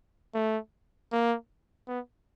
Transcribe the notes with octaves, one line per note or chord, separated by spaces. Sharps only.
A3
A#3
B3